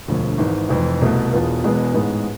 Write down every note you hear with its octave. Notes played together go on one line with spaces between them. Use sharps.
E1 D2 D3 F3
G#1 G#2 E3
F1 F2 E3
C2 B2 A3
E1 E2 B2 B3 F4
E1 E2 B2 G#3 B3
A1 G#2 G#3 B3